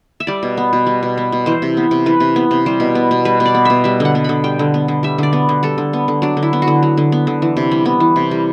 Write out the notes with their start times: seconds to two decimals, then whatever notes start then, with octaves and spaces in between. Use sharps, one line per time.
0.20 E5
0.27 G3 D5
0.43 B2
0.57 B3
0.73 B2
0.87 G3
1.03 B2
1.17 B3
1.32 B2
1.46 E3 C5
1.62 C3
1.77 B3
1.91 C3
2.06 E3 B4
2.20 C3
2.36 B3
2.51 C3
2.66 G3 C5
2.80 B2
2.95 B3
3.11 B2
3.25 G3 B4
3.40 B2
3.46 D5
3.55 B3
3.65 B2 E5
3.84 G3 E5
4.00 D3 F#5
4.15 B3
4.24 D3 B5
4.44 G3 G5
4.59 D3
4.74 B3
4.88 D3
5.03 G3 E5
5.18 D3 D5
5.33 B3
5.49 D3
5.63 G3 A4
5.78 D3
5.93 B3
6.08 D3
6.22 F#3 D4
6.37 D3
6.43 E4
6.53 B3
6.62 F#4
6.67 D3
6.83 F#3
6.97 D3
7.12 B3
7.27 D3
7.42 E3
7.57 C3
7.71 G3
7.85 B3
8.00 E3
8.16 C3
8.31 G3